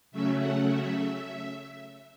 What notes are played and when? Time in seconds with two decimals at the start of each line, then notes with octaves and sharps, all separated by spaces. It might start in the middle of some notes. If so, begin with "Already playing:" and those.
0.11 C#3 F#3 A3 C#4 E5
0.40 F#5
0.68 E5